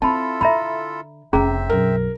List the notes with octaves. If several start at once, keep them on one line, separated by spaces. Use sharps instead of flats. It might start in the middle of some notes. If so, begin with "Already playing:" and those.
C4 E4 F4 A4 A5 B5
D3 E5 A#5 B5
F1 C#3 C4 C#4 G#4 E5 A#5
B1 F#2 A#4